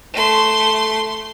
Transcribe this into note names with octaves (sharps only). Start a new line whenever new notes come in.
A3 C6